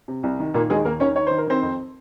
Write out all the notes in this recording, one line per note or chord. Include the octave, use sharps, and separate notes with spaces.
C3
C2
D#3
A#2 D#3 A#3
D#2 G#3 G#4
D#2 A#3 A#4
D#3 C#4 C#5
D#3 C#5
D#3 C5
A#4
D#3 C4 C5
F2